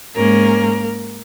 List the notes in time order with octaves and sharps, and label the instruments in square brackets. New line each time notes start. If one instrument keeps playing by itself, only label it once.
[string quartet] G#2 G#3 A#3 C#4 A#4